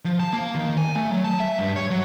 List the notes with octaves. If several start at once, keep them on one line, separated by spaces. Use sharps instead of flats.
F3
A5
A#3
D#3
G#5
A3
F#3
A5
E5
G2
C#5
F#3